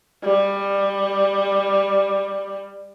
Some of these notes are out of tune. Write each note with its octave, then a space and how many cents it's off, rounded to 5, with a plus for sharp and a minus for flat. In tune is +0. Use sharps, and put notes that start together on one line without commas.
G3 +15